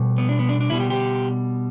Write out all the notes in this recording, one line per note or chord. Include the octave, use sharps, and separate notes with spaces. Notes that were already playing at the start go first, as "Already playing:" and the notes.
Already playing: B2 G3
B3
D4
B3
D4
D4
B2 G3 E4
G4
G4